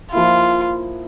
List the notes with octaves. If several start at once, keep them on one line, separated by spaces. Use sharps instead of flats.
F3 A#3 E4 F4